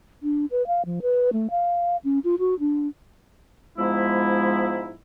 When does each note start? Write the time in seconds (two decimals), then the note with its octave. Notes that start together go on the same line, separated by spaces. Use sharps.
0.23 D4
0.51 B4
0.67 F5
0.85 F3
1.02 B4
1.33 A3
1.50 F5
2.04 C#4
2.24 F4
2.39 F#4
2.59 D4
3.77 G#2 F3 G#3 B3 E4